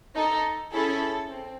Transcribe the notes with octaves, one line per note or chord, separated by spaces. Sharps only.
D#4 A4
C#4 E4 G#4 A4
C4